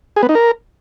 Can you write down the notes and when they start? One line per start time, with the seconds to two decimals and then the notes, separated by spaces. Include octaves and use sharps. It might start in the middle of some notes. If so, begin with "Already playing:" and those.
0.16 G#4
0.23 B3
0.29 D#4
0.35 A#4